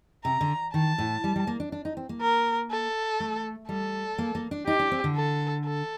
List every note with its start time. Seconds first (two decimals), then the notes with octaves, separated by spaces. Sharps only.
0.25 C3 A#5
0.41 D3
0.74 D#3 A5
0.98 A2
1.24 G3
1.36 G3
1.47 A#3
1.60 D4
1.72 D4
1.85 D#4
1.97 C4
2.09 A#3
2.21 A#4
2.71 A4
3.20 A3
3.68 G3 A4
4.18 A#3
4.35 A#3
4.51 D4
4.67 D#4 G4
4.79 D4
4.92 C4
5.04 D3
5.16 A4
5.66 A4